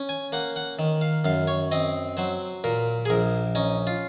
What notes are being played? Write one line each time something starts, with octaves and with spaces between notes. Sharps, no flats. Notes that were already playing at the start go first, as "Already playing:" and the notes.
Already playing: C#4
G#5
A#3 F#5
F#5
D#3
F5
F#2 F5
C#5
C4 D#5
F#3 C5
A#2 A#4
G#4
A#1 A#4
C#4 D#4
F4